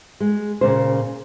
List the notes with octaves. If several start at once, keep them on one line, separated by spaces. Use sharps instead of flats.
G#3
A#2 C#3 C5